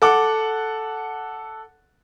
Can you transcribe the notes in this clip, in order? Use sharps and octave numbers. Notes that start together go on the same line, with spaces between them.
A4 F#5 D6